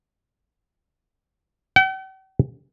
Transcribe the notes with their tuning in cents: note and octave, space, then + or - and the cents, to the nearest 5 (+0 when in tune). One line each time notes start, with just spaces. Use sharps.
G5 -45